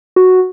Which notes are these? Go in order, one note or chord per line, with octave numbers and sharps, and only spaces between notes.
F#4